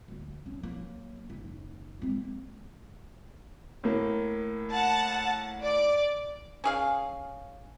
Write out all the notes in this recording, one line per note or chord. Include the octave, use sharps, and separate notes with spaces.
D2 A3
C#4
F#3 A#3
F#1 D#2
G#3 C4
A#3
A2 A#3
F#5 A5
D5
C#4 G#4 F5